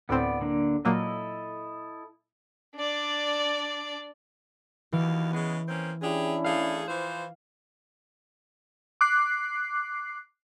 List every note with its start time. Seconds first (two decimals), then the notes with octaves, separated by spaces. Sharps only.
0.09 D2 A2 B3 C4 D5
0.41 D3 A#3 D4
0.85 A#2 F#3 A#3 E4 A4 D#5
2.76 D4 D5
4.92 D#2 B2 E3 F5
5.33 C#3 G#3 B3
5.67 A#3 C4 C#4
6.01 C#4 D4 E4 G4 G#4
6.44 A3 G#4 F5
6.87 E3 F3 C5
9.01 D6 F#6 C7